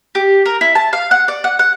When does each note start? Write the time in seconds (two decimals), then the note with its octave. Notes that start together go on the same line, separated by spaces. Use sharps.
0.15 G4
0.46 A#4
0.61 E4
0.75 A5
0.93 F5
1.11 F#5
1.28 D5
1.44 F#5
1.59 F#5